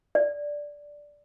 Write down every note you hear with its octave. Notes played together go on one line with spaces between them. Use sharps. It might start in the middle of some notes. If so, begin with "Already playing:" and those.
D5